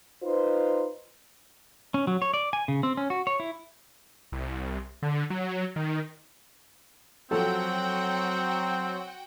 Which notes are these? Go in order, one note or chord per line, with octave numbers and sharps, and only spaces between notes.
D#4 F4 B4 C5
C#4
F#3
C#5
D5
G#5
C#3
C4
C#4
F#4
C#5
E4
C2
D3
F#3
D#3
F3 F#3 C4 F#4 A4 F#5 G5